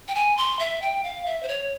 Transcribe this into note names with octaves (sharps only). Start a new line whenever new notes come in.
G5
G#5
C6
E5
G5
F5
E5
C5
C#5